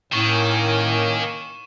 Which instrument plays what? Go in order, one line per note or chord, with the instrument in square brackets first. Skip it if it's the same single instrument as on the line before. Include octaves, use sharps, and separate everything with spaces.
[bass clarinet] A2 [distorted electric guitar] D#3 [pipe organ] A#3 C#4 [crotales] C#6 E7